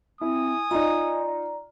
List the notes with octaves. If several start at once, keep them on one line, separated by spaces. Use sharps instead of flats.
C4 E4 G#5 D#6
D#4 F4 D5 D#5 A#5